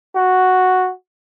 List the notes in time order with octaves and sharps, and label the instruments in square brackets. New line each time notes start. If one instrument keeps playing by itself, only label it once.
[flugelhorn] F#4